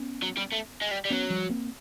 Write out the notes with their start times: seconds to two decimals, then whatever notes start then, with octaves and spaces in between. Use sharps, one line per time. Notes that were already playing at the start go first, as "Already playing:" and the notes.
Already playing: B3 C#4
0.22 F#3
0.37 G3
0.52 A3
0.81 G#3
0.91 G3
1.05 G3
1.10 F#3 B3 C#4
1.30 F3 G3
1.49 A#3 C4